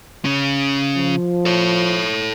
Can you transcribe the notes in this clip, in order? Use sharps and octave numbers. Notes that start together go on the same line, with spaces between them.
C#3 C#4
F3
A4 C#5